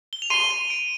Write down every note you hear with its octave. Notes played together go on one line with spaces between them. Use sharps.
G7
F7
C6 D#7
D#7
D7